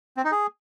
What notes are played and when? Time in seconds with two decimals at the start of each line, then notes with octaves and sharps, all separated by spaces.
0.17 C4
0.24 D#4
0.32 G#4